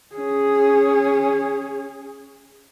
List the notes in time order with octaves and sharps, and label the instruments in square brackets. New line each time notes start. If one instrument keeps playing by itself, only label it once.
[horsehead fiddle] C#4 G#4